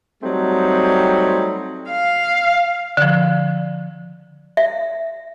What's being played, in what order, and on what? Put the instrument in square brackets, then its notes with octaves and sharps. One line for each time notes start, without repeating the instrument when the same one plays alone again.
[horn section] F#3 G3 A3 C4 D#4
[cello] F5
[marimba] D3 F3
[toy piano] E5